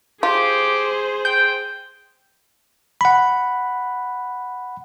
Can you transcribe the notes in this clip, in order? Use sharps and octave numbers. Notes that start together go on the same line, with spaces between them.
F4 G4 G#4 C5
G5 G6
F#5 B5